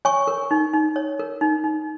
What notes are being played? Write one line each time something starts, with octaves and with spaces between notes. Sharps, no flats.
C#5 G#5 C#6
A#4
D#4
D#4
C#5
A#4
D#4
D#4